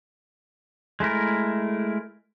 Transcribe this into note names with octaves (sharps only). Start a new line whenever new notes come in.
G#3 A3 E4 A#4